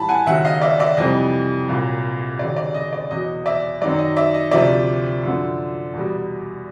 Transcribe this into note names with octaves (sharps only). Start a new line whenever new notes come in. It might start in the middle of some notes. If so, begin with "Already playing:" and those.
Already playing: A2 E3 G3 A5 B5
F#5 G#5
D#2 C#3 F#3 E5 F#5
D#5 F5
D5 E5
D5 E5
F2 C3 E3 G3 D#5
C2 A#2 F#3
D#2 C#3 F#3 D5
D5
D#5
D5
E2 B2 F#3 D#5
D5 E5
F#2 D#3 F#3 D5
D#5
D5 E5
D#5
D2 C3 F3 D5 E5
F#2 D3 F3
E2 B2 G3